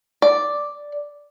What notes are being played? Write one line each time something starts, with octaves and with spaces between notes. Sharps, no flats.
D5